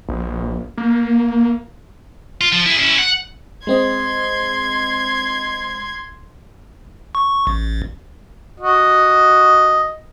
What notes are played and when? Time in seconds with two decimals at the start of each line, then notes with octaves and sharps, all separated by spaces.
0.09 A#1
0.78 A#3
2.41 F4
2.52 F3
2.66 E4 G#4
2.78 C#4 E4
2.99 F#5
3.67 G#3 C4 D#5 C6 G#6
7.15 C#6
7.47 A1
8.60 F#4 D#5